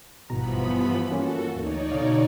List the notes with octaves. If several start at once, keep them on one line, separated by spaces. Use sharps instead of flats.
G#1 G2 B2 E3 F3 B3 A#5 B5
D#6
A#3 C#4 F4 F#4 A4
D2 E3 D#4 C#5 D5
B2 D3 F5